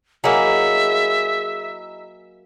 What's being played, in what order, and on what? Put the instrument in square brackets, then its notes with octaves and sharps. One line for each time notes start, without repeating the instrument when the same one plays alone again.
[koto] F#3 A#3 [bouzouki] D#4 E4 G#4 [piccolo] E5